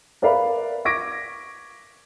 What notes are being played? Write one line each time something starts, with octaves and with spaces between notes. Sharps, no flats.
A#4 B4 D5 E5 F5 B5
C#6 D6 G#6 A#6 B6 D7